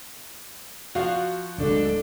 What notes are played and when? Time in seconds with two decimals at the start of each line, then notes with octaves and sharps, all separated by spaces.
0.95 F3 F#4 F5
1.58 D1 D3 G#3 D4 A4